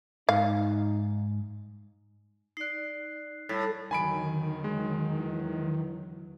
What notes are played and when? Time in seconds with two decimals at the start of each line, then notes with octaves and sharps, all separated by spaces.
0.29 G#2 D#4 F5
2.57 D#4 D5 F#6 C7
3.49 A2 G3 A6 B6
3.91 E2 D3 D#3 F#3 G#5 B5 D7
4.64 G#3
5.16 E3